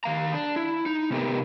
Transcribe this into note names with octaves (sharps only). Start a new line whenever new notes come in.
D#3 F5 A#5
D4
E4
D#4
C3 B3 D#4 G4 A#4